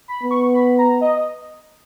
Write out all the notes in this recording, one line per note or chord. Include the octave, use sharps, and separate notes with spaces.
B5
B3
C#6
B5
A#5
D#5